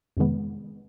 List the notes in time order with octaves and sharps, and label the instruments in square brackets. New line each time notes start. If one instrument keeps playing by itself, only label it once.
[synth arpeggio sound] F2 C3 D#3 G#3 B3